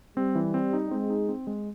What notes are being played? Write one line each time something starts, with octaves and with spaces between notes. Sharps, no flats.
G3 C4
E3
C4
D#4
G#3 C4
D#4
C4
G#3